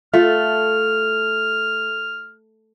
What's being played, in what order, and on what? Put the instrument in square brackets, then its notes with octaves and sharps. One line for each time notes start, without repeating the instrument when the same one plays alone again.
[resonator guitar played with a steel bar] A3 [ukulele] F4 [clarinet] F6